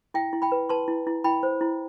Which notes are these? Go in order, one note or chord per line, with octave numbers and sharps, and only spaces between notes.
E4 E5 G5
E4
G5 B5
B4
B4 A5 C6
E4
E4
E4 G5 B5
C5
E4